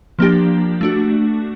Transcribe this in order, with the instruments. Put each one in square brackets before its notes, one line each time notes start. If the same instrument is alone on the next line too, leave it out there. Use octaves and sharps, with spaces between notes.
[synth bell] F3 A#3 D4 G4
A3 D4 F#4